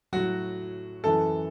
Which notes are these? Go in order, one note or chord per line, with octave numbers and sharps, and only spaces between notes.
A2 F#3 F#4
F#2 E3 A4